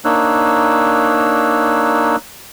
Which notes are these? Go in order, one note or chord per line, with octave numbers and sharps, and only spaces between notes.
A#3 D4 D#4 C#5 E6 F#6